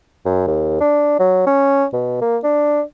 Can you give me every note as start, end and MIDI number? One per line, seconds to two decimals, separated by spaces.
0.25 0.44 42
0.47 0.80 39
0.80 1.18 62
1.19 1.43 54
1.47 1.86 61
1.93 2.19 47
2.21 2.38 58
2.43 2.81 62